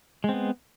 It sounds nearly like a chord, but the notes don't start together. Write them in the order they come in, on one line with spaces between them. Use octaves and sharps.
G#3 C4 B3